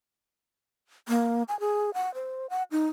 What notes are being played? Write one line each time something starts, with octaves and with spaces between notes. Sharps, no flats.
A#3
G#5
G#4
F#5
C5
F#5
D#4